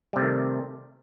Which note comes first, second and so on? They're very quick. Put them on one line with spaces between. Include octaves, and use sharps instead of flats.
G3 C3 A3 D#3